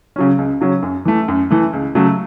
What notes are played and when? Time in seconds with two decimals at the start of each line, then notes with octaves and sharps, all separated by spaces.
0.16 C#3 F#3 C#4
0.38 C#2
0.61 C#3 F#3 C#4
0.83 F#2
1.05 E3 A3
1.28 F#2
1.50 E3 A3
1.73 C#2
1.95 C#3 F#3 A3